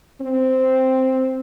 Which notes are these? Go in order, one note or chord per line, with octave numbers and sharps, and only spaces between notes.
C4